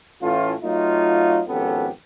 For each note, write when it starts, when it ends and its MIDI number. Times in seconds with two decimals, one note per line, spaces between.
0.22 0.54 45
0.22 0.54 52
0.22 0.54 57
0.22 0.54 61
0.22 0.54 65
0.63 1.42 54
0.63 1.42 57
0.63 1.42 63
0.63 1.42 65
1.48 1.89 32
1.48 1.89 41
1.48 1.89 59
1.48 1.89 61
1.48 1.89 67
1.48 1.89 69